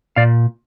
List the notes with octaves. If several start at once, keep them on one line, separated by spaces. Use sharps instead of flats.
A#2 D5 F5